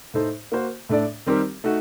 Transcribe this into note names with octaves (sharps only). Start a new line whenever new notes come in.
A2 A3 D#4 A4 C5
A#3 F#4 C5
A2 A3 D4 A4 D5
D#3 G3 C4 G4 A#4
A3 D#4 F#4